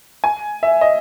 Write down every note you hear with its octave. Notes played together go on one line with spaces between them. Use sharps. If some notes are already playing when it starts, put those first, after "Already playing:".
G#5
E5
D#5